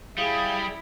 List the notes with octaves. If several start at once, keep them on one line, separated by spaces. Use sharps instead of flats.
G3 E4 G#4 F5 D#6